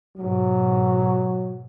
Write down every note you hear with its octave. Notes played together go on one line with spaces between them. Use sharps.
G#2 B2 F#3